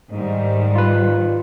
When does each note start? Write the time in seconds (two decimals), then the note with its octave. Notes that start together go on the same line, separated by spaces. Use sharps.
0.12 G#2 D#3 G3
0.75 F4 B4